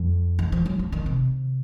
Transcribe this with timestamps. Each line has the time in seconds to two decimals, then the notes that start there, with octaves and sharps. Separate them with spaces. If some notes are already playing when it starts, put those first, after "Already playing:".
Already playing: F2
0.39 D#3
0.52 F3
0.66 F#3
0.79 F#3
0.92 D#3
1.06 C3